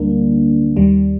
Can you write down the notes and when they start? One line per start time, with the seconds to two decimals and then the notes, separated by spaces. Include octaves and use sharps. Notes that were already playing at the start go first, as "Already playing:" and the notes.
Already playing: D2 D3 G3 A#3 D4
0.76 D#2 D#3 G3